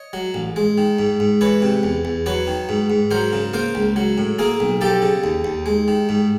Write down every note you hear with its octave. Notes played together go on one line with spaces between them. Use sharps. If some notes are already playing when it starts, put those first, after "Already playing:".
Already playing: C#5 D#5
F#3
A1
G#3
D#3
G#2
G#2
E3 B4 C#5
C3
E2
E2
F#3 B4 C#5
D#3
G#2
G#2
F#3 A#4 C5
C#3
A#3 A#4 C5
C#2
F#3
A2
A#3 G#4 A#4
B1
F3 G4 A4
C#3
D#2
D#2
G#3
D#3
G#2